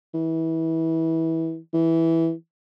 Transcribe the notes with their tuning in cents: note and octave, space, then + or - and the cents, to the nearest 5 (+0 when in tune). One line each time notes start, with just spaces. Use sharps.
E3 -25
E3 -5